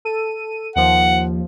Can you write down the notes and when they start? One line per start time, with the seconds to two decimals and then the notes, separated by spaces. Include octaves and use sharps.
0.05 A4 D#7
0.76 D#2 F3 F#5